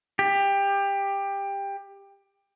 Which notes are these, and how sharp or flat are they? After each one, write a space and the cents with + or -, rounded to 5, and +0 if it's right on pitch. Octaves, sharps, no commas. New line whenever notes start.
G4 +20